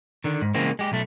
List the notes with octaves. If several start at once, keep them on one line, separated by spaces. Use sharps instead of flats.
D3 D#3
G#2
C#3 E3 G#3 A#3 C4
G#3 G4
B1 A3